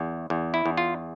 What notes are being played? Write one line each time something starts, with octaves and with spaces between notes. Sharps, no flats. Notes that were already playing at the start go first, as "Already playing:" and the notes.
Already playing: E2
E2
E4
E2
F4